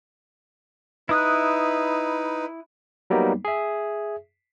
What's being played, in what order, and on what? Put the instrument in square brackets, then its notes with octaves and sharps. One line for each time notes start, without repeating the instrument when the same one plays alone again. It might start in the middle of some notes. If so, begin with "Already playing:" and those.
[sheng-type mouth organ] D#4 B4 [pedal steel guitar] E4 D#6 F#6
[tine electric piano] F#3 G3 A#3 B3 D#4
G#4 E5